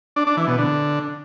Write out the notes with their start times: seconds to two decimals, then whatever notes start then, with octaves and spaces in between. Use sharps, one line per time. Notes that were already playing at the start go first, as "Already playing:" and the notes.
0.16 D4
0.27 D4
0.37 E3
0.48 B2
0.58 D3